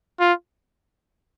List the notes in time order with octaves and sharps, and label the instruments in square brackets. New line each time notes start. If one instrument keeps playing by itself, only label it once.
[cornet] F4